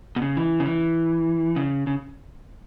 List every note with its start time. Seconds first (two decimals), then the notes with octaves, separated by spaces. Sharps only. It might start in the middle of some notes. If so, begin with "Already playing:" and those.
0.16 B2
0.22 C#3
0.37 E3
0.60 C#3
0.66 E3
1.56 C#3
1.87 C#3